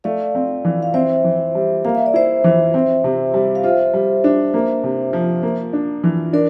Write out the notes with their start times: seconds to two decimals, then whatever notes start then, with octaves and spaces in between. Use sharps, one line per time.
0.04 A3 D5 F5
0.35 C4
0.65 E3
0.83 F5
0.94 C4 C5 E5
1.24 E3
1.55 G3
1.85 A#3 F5
1.95 E5
2.06 D5
2.14 E4 C5 E5
2.44 E3
2.74 C4
3.04 C3
3.34 G3
3.55 F5
3.64 F4 C5 E5
3.94 G3
4.24 D4
4.54 A#3
4.84 C3
5.13 F3
5.43 A#3
5.73 D4
6.04 E3
6.33 D4 A#4 D5